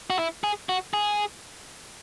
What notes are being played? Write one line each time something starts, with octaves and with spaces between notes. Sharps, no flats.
F#4
E4
G#4
F#4
G#4